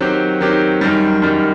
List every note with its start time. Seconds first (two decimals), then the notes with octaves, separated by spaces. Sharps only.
0.01 D#3 F#3 C4 G4
0.41 D#3 F#3 C4 G4
0.81 F#2 D#3 G3
1.22 F#2 D#3 G3